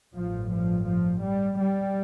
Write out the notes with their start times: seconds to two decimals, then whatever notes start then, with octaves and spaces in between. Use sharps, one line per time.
0.15 A1 G2 F3
0.51 F3
0.87 F3
1.23 G3
1.59 G3